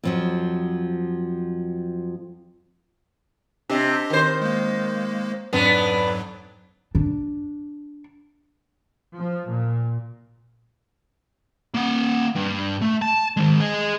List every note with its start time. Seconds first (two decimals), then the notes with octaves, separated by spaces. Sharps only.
0.04 F2 F3 F#3
3.70 C3 D4 G4 D#5
4.10 D#3 C5
4.42 G#3 A#3
5.53 F2 G#2 F#3 B3 D4
6.95 D4
9.17 F3
9.48 A#2
11.74 A#3 F#5
12.36 G2
12.82 A3
13.02 A5
13.37 D#3 G#3
13.60 G#4 D#5